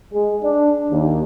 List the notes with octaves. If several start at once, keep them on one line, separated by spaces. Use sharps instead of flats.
G#3
D4
D#2